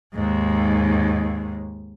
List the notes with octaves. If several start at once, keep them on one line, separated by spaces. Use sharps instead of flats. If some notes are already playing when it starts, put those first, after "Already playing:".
D#2 G#2